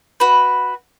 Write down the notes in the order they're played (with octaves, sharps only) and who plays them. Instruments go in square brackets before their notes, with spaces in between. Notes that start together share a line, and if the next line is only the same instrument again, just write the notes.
[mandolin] F#4 B4